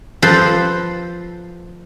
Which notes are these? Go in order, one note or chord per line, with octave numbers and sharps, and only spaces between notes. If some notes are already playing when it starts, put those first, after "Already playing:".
F3 A4 B4 C5